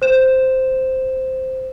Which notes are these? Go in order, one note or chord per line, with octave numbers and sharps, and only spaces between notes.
C5 E7